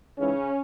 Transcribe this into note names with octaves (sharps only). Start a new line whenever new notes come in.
G#2 C#3 E3 C#4